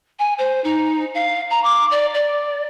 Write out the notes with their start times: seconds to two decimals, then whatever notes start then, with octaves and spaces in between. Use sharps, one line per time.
0.19 G#5
0.38 C5
0.64 D#4
1.14 F5
1.50 A#5
1.64 D6
1.91 D5
2.14 D5